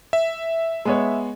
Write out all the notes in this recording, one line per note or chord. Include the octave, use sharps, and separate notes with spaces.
E5
G#3 B3 C#5